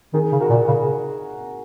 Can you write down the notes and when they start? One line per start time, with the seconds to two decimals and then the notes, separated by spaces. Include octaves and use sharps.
0.13 D#3 D#4 G#4
0.32 C#3
0.40 F#4 A#4
0.50 A#2
0.68 C#3 G#4